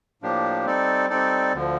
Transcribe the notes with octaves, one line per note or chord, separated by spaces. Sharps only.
A2 F3 A#3 D4 G4
G3 C4 D#4 A4 D5
G3 C4 D#4 A4 D5
D2 D3 F3